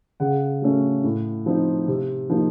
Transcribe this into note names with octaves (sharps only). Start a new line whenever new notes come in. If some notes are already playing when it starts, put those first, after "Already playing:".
C#3 F#5
F#3 A3 C#4
A2
F3 C4 D#4
C3
F3 A#3 D#4